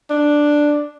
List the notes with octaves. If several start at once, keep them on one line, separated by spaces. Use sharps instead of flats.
D4